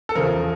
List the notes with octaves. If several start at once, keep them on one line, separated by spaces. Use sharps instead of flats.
A4
E2 C#3 F3 A#4